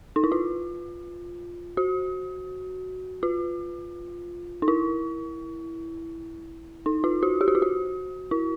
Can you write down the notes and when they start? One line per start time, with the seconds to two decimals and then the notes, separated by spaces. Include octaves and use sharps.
0.16 D#4
0.24 E4
0.32 F4
1.77 F#4
3.23 F4
4.62 D#4
4.68 E4
6.86 D#4
7.04 F4
7.23 F#4
7.41 G4
7.48 F#4
7.55 F4
7.62 F#4
8.31 E4